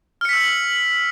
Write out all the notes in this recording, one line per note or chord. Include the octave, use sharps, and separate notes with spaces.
E6 F6 B6 C#7 F#7